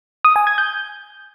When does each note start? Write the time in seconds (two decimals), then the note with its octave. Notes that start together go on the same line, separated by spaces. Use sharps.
0.25 D#6
0.36 G#5
0.47 G#6
0.58 G6